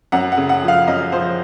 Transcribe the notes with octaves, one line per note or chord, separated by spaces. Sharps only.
F#2 F#5
F#5
C#3
F#5
F3
F5
F#2 D#5
F3 C5